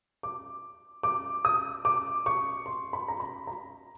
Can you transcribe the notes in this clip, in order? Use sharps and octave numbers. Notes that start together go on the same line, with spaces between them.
D6
D6
D#6
D6
C#6
C6
B5
A#5
B5
A#5